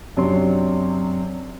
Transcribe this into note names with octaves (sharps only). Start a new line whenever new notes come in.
F#2 C3 F#3 D4 D5 C6